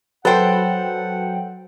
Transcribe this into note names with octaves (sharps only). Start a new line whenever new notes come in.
F#3 A4 B4 C5 F#5 G5